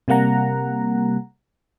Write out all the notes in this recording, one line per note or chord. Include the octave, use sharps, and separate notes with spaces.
C3 G3 A#3 F#5 A#5